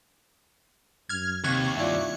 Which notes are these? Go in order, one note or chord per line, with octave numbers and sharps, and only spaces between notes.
F#2 F6 G#6
D#2 C3 C#6 F#6 G#6
G2 E4 F4 D5